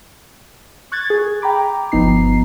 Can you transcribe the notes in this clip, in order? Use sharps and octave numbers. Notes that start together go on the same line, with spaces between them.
C#6 F#6 G#6 A6
G#4
G5 A#5 B5 D6
G1 F3 B3 D#4 A#5 C7